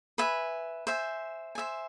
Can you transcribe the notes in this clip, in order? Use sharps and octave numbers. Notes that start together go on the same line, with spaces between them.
B4 E5 G#5
C5 E5 G#5
C5 E5 G#5